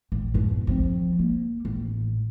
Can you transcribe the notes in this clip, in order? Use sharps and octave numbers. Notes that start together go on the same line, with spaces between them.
A1
F#2 B2
F3 C4
A#3
A1